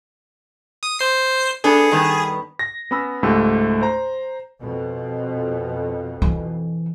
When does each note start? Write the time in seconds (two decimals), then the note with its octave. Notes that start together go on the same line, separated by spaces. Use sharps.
0.83 D#6
0.99 C5 C7
1.64 B3 D4 G#4 A4
1.91 G2 D#3 B3
2.59 A#6
2.91 B3 C#4 B5 E6
3.23 C#2 G#2 A3 G4 E6
3.81 C5 A#5
4.59 F2 B2
6.22 E3